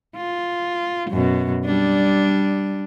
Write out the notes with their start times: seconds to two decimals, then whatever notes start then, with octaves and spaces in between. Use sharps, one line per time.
0.16 F4
1.10 F#2 B2
1.65 G3 D4